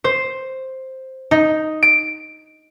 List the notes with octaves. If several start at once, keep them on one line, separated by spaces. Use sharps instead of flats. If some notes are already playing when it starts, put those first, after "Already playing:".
C5
D#4
D7